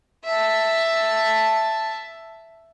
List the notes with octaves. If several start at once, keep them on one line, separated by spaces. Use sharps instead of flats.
E5 A5